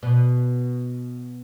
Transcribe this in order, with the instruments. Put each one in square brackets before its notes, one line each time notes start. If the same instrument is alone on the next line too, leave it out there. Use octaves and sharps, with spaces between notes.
[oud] B2